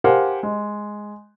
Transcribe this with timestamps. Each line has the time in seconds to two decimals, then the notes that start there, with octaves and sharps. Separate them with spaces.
0.04 G4 A#4 C5 F5 F#5 G#5
0.43 G#3